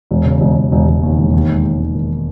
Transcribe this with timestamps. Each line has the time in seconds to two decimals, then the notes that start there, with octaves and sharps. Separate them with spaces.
0.11 E1
0.25 C#3
0.41 E1
0.56 E1
0.72 E1
0.87 E1
1.03 D#2
1.18 E1
1.34 D#2
1.49 G#3
1.65 G#3
1.80 D#2
1.95 D#3